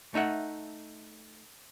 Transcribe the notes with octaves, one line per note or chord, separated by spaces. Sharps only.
A3 D#4 E5 F#5